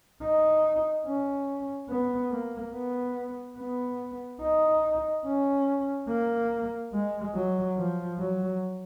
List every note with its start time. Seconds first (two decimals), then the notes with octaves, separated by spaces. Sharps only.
0.22 D#4
1.06 C#4
1.89 B3
2.31 A#3
2.73 B3
3.58 B3
4.42 D#4
5.26 C#4
6.09 A#3
6.93 G#3
7.35 F#3
7.77 F3
8.19 F#3